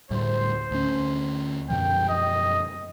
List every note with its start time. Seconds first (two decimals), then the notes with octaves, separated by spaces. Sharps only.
0.11 D2 A2 G3 C5
0.71 D2 C#4
1.70 F#2 B2 F3 G5
2.09 D#5